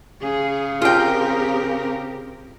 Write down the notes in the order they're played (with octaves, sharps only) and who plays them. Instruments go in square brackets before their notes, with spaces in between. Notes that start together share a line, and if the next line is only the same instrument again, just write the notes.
[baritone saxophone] C#3 [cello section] G#4
[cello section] C4 G4 A#4 [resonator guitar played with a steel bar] F4 G5